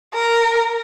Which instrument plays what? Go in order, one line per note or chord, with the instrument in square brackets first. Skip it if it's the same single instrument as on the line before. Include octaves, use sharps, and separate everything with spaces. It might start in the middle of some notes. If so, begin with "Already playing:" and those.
[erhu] A#4